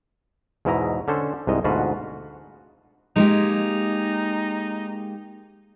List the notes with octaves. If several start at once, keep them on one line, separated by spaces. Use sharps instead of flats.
E2 G#2 B2 E4 D#5 A#5
D3 C#4 A4 C5
C2 G#2 D#5
D2 G#2 B2 F4 F#4 B4
G#3 A#3 D#4 G4